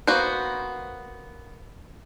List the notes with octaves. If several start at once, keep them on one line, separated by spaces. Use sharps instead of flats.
A#3 B3 F#4 B4 C5